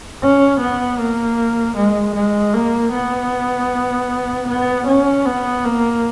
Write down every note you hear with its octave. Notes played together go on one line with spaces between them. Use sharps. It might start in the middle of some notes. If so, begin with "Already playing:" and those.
C#4
B3
A#3
G#3
G#3
A#3
B3
B3
C#4
B3
A#3